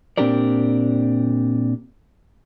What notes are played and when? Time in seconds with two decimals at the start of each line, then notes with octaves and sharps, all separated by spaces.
0.17 A#2 C4 D4 G4 A#4 D5